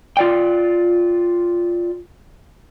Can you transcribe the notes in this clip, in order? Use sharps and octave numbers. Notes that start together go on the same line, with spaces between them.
F4 D5 G5